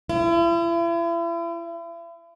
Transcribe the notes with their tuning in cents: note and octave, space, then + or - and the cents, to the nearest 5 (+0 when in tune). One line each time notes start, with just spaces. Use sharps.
E4 +40